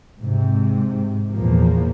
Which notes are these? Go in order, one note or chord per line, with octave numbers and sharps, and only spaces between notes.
G#2 C3
E2 A#2 F3 A#3